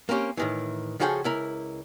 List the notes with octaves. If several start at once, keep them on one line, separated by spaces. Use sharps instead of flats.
A#3 C4 C#4 G4
A2 D#3 E3
C#3 F3 F#4 G#4 A4 G5
C#2 E4 A#4